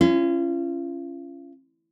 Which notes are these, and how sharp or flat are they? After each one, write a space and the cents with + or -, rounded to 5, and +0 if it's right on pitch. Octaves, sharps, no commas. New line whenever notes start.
C#4 -10 F4 -40